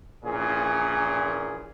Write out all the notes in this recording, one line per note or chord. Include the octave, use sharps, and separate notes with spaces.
A#1 A#2 E3 C#4 G#4